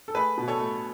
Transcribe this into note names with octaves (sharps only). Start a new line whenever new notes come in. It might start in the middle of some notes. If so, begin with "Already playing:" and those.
A4
A3 G#4 B4
B2
A4 C#5
A3